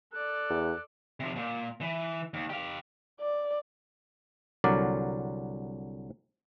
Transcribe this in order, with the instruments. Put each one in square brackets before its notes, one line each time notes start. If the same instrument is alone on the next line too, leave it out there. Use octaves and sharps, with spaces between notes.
[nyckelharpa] A4 D5 [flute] F#6
[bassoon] E2
[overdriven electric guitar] C3 F3
A#2
E3
D#2
G4 F5
[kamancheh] D5
[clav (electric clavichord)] C2 D3 F#3 A#4 D5